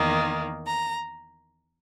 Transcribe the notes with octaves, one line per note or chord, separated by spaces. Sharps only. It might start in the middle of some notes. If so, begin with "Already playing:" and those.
Already playing: E2 D#3 A#3
A#5